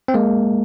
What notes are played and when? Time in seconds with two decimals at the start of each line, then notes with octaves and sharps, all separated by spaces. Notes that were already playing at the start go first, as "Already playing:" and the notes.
0.08 C4
0.14 G#3 A#3